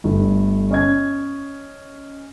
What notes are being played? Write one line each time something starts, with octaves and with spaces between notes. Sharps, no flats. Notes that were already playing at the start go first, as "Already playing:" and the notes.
G1 G2 A3
C#4 D#5 G#6